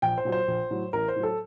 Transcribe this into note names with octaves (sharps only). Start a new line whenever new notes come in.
A#1 G5
C5
A#2 F#3
C5
A#1
A2 F#3
A1 A#4
C5
A2 F#3
A4